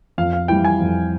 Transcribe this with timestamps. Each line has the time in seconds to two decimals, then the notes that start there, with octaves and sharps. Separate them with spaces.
0.18 F2 F5
0.33 F5
0.48 E3 G3 G5
0.65 G#5
0.80 F2